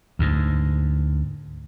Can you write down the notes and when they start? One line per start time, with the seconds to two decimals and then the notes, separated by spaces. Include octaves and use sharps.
0.19 D2 G#2